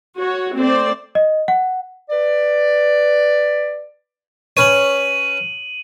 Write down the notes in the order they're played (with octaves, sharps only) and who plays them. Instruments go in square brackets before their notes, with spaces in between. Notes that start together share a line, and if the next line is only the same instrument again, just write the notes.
[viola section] F#4 C#5
A3 C4 C5 D5
[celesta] D#5
F#5
[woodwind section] B4 D5
[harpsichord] C#4 B4 C#5 [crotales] D#7 F#7